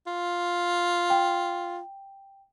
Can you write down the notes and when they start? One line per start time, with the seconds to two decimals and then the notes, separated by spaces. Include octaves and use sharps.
0.07 F4
1.10 G5